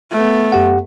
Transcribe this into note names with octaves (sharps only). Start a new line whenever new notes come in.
A3 B3
F#2 G4 F#5